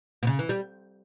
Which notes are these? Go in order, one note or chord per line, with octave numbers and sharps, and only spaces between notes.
B2
C#3
E3
G3